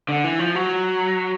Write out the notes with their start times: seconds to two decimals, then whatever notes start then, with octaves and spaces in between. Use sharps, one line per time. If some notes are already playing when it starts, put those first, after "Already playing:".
0.09 D3
0.24 E3
0.39 F3
0.55 F#3